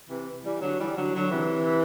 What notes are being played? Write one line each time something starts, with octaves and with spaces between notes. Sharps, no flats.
C3 E3
E3 G3
D3 F#3
E3 G3
D3 F#3
D3 F#3
C3 E3